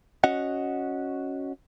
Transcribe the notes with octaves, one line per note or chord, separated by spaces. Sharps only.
C#4 F#4 D#5 F#5